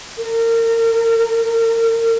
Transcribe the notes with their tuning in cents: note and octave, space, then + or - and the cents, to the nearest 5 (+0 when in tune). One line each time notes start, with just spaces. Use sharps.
A#4 -35